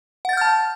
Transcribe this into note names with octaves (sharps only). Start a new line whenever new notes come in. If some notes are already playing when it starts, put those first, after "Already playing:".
F#5 A5 F6 G6 A6